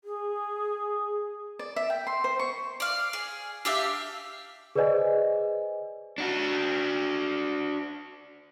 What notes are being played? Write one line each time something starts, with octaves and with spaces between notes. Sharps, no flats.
G#4
D5
E5
G5
C6
C5
C#6
D5 F5
G#4
D4 G4 E5 F5
G#4 B4 C5 D5 D#5 G#5
D4 F#4